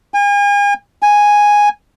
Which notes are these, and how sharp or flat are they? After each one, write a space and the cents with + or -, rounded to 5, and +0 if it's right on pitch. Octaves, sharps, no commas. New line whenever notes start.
G#5 -40
G#5 -5